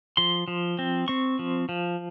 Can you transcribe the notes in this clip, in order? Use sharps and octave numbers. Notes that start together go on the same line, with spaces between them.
F3 C6
F3
C4
C4 C#6
F3
F3